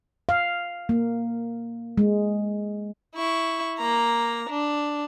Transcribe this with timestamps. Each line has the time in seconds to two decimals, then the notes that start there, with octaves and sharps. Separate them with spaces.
0.29 F5
0.89 A#3
1.98 G#3
3.15 E4 C#6
3.78 A#3 A#5
4.50 D4